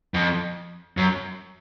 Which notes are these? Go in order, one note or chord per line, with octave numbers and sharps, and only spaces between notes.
F2
F#2